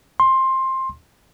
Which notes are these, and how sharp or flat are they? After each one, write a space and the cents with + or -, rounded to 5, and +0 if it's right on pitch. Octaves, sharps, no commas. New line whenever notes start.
C6 +15